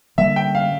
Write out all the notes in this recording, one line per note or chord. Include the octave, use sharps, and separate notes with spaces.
D3 G3 A#3 E5
G5
F5